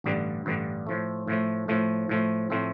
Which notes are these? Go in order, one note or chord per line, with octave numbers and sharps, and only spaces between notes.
A1 G2 D3 G3
A1 G2 D3 G3
A2 F3 A3
A2 F3 A3
A2 F3 A3
A2 F3 A3
A2 F3 A3 C4